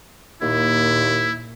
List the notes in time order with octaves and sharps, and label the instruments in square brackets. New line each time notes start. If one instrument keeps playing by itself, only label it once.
[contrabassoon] D#2 [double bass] A#2 [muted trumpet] E4